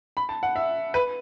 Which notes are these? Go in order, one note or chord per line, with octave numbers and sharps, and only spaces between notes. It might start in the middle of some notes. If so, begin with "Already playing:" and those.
B5
A5
F#5
E5
B4